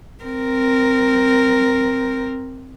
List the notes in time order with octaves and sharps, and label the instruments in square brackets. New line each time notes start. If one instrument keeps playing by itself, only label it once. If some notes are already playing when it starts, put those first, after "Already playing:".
[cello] C4 A#4